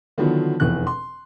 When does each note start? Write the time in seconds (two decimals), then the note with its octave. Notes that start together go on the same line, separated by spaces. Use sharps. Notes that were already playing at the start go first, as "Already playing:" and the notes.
0.18 D3 D#3 F3 F#3 B3 E4
0.60 F1 E2 F#6
0.87 C6